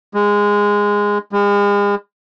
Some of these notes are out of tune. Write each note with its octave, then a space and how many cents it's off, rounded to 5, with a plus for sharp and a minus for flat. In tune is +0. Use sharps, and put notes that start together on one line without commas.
G#3 -15
G#3 -40